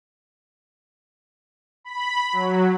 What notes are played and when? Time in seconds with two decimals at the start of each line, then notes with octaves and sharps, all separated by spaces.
1.84 B5
2.33 F#3